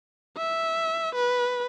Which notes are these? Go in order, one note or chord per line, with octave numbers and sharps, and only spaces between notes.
E5
B4